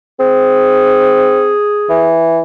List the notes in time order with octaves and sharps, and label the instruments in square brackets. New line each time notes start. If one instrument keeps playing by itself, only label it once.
[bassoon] C4 [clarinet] G#4
[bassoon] E3